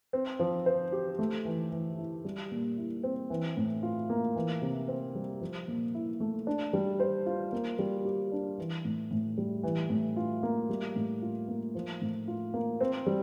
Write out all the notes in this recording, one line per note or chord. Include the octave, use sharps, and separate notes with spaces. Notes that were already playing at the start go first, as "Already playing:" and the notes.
C4
F3
C5
G4
A3
E3
E3
E4
G3
A#2
E4
C4
E3
A2
F4
A#3
E3
C3
C4
G3
F3
A#2
E4
A3
D4
G3
C5
F4
A#3
G3
G4
D4
E3
A2
A2
G3
E3
A2
F4
A#3
G3
A2
F4
A#3
F3
A2
F4
A#3
C4
G3